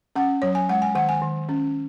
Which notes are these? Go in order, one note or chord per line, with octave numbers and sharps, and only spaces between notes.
C#4 F#5
F#3 C#5
G#5
G#3 F#5
G#5
D#3 F#5
G#5
D#3
C#4